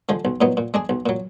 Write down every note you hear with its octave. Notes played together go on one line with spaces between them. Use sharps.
D3 F3 G#3
B1
A#2 F#3 B3 D#4
A#2
G#3 D4 G#4
B1
A#2 F#3